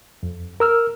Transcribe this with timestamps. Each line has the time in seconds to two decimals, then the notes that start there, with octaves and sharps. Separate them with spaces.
0.23 F2
0.60 A#4 E6 F6